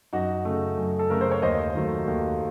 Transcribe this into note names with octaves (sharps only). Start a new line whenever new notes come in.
F#2 D#4 F#4
C#3 A3
F#2
A4
C#3 A3 A#4
C5
C#5
D#2 C5 D#5
D#3 F#3 A3
D#2